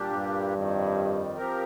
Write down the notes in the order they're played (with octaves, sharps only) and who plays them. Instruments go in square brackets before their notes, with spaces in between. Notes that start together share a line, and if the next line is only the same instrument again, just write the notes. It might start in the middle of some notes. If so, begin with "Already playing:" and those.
Already playing: [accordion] A#2 G3 A#3 D4 G4
[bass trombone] G2
[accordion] F2 D#3 G3
F3 C4 G4 A#4